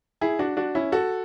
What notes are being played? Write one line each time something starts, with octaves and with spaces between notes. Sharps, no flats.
E4 G#4
D4 F#4
D4 F#4
C#4 E4
F#4 A4